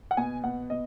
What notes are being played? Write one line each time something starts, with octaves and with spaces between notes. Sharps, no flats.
F#5
B2 G#5
B2 F#5
B2 D#5